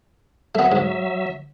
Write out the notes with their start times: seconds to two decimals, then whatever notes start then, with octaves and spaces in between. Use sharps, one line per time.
0.55 F#3 A3 B3 E5
0.72 G#2